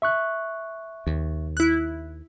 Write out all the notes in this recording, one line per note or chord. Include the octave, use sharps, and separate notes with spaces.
E5 C#6 F#6
D#2
E4 F#6